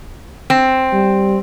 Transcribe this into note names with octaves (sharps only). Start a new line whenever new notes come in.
C4
G3